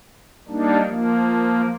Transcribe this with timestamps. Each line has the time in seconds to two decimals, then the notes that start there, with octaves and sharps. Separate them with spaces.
0.48 G3 A#3 D4 D#4
0.85 F3 A#3